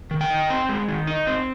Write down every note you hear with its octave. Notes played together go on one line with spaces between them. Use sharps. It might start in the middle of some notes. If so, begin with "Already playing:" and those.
D#3
G5
D#4
C4
G#3
D#3
D#4
C4